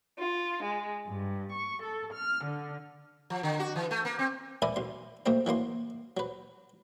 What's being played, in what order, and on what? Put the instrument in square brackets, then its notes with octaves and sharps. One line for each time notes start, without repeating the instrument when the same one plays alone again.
[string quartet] F4
G#3
G2
C#6
A4
F6
D3
[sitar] F3
D3
F#4
E3
A3
A#3
C4
[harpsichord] A#4 B4 D5 E5 G#5 B5
B1 C6
B1 A3 A#3 C4 C5
E3 F#3 A#3 C6
F#3 B4